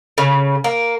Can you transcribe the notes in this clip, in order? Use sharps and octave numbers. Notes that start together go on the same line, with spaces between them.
C#3
A#3